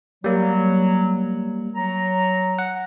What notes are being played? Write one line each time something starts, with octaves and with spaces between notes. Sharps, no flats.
F#3 G3 A#3
F#3 A#5
F#5